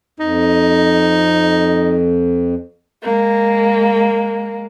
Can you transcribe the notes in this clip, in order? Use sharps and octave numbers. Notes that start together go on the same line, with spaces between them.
F2 D#4
G#3 A#3